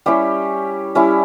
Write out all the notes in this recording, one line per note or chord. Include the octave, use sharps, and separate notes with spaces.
G3 C#4 E4 G4
G3 C#4 E4